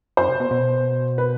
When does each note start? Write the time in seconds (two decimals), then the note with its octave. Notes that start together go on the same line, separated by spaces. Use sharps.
0.17 F#2 C5
0.29 C3
0.40 B2
0.51 B2
1.18 B4